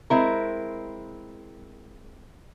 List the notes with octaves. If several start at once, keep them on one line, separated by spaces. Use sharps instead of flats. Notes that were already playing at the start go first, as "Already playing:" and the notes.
G#3 C4 E4 A#4